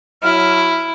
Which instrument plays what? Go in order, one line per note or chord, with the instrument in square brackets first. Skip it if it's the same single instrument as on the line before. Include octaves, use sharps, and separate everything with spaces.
[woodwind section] F#3 F6 [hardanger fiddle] E4